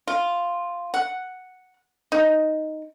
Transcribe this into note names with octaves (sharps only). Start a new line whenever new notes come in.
F4
F#5
D#4